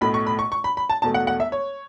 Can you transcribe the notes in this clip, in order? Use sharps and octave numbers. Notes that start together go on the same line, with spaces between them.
B1 A2 A3 B5
C#6
B5
C#6
C#6
B5
B5
A5
E1 E2 B2 A3 A5
F#5
F#5
E5
C#5